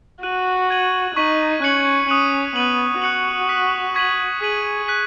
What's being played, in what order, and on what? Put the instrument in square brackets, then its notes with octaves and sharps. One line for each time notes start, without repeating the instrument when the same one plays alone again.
[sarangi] F#4 [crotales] F#6 D#7 F#7
[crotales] C#6 G#6 D#7 F#7
[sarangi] D#4 [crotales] C#6 B6 D#7 F#7
[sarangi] C#4 [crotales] F#6 C#7 F#7
[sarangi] C#4 [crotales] D#6 F#6 D#7 F#7
[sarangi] B3 [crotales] F#6 D#7 F#7
[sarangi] F#4 [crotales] F#6 C#7 F#7
[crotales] D#6 F#6 B6 D#7
C#6 G#6 B6 D#7 F#7
[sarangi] G#4 [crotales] D#6 B6 D#7 F#7
[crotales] F#6 B6 D#7 F#7